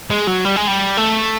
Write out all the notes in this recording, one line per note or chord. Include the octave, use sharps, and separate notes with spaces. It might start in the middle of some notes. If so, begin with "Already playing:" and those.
G#3
F#3
G3
G#3
G3
A3